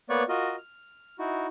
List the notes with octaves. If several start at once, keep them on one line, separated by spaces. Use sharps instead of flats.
A#3 B3 B4 C#5 D5 C#6
F4 F#4 A#4 D#5
F6
D#4 E4 F#4